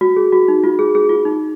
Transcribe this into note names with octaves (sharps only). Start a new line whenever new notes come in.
F#4
G#4
F#4
D#4
F4
G#4
G#4
F4
D#4